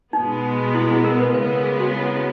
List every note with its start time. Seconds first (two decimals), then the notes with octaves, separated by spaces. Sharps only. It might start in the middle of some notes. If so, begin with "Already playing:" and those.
0.13 B2 G#3 B3 D#4
0.74 E4
0.89 G#4
1.04 A#4
1.20 B4
1.34 C#3 G#3 B3 B4
1.50 A#4
1.64 G#4
1.80 F#4
1.95 E4